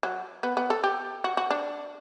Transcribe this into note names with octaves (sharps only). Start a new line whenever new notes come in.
F#3
B3
B3
A4
G4
F#4
F#4
D4